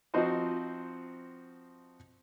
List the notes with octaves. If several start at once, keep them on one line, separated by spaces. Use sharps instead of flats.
F3 C4 D#4 F#4 C5 D#5